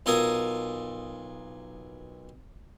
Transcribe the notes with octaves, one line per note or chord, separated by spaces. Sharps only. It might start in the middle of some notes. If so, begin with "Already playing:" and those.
B1 F4 A4 A#4 G#5 D#6